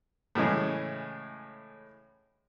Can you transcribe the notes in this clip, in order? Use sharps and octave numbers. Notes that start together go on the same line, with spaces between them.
A2 C#3 E3 G#3